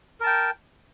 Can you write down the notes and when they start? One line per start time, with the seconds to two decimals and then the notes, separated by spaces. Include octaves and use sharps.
0.20 A#4
0.23 A5
0.26 G5